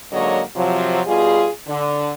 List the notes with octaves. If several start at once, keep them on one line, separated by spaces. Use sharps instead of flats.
G#2 D3 F#3 A#3 C#5 D#5
C3 F3 F#3
B2 G3 F4 G#4
D3